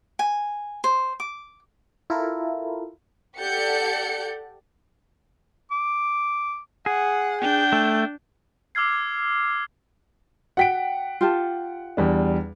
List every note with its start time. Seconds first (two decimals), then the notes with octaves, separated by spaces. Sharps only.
0.19 G#5
0.84 C5
1.20 D6
2.10 E4 F4 A4 A#4
3.39 G4 A4 D5 F#5 G6 C#7
5.71 D6
6.86 G#4 F#5
7.41 D4 G5 G6
7.72 A3
8.75 D6 E6 F6 G#6 C7
10.57 F#4 F#5 G5 B6 D7
11.21 F4 G4 A5
11.97 E2 G3 D4